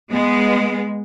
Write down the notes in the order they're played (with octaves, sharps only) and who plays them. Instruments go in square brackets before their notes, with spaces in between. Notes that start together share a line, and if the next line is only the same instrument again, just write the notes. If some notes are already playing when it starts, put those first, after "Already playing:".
[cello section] G#3 B3